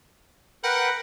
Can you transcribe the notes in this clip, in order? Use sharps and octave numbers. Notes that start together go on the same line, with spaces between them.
A#4 B4 F#5 G5